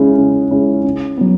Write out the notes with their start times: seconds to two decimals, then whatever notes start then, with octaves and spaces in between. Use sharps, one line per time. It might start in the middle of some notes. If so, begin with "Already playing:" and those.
Already playing: C#3 G#3 C#4 E4
0.17 C#3
0.51 G#3 C#4 E4
0.84 C#3
1.18 F#3 B3